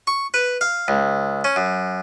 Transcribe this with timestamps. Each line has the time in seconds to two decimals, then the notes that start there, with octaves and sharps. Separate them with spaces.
0.07 C#6
0.34 B4
0.61 F5
0.88 C#2
1.44 C#4
1.56 F#2